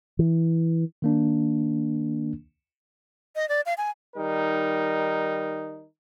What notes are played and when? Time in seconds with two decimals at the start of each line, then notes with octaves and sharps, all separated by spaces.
0.19 E3
1.02 D#3 A#3 D4
3.36 D#5
3.49 D5
3.66 F5
3.78 G#5
4.16 D#3 G3 D#4 A#4